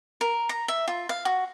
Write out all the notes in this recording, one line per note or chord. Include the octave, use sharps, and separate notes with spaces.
A#4
A#5
E5
F4
F5
F#4